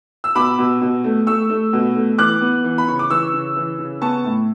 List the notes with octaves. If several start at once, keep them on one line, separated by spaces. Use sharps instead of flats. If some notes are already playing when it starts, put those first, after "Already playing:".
E6
B2 B5 D6
B2
B2
A3
A3 C#6 E6
A3
B2
A3
E3 D6 F#6
B3
E3
B5
C#3 C#6
D6
E3 C#6 E6
C#3
E3
C#3
B3 A5 C#6
A2